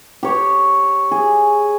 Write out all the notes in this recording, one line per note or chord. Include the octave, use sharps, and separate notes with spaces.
G4 C#5
G#4